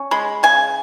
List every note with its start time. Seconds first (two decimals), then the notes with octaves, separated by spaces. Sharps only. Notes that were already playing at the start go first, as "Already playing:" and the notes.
Already playing: C#4
0.11 G#3 B5
0.43 C#3 G#5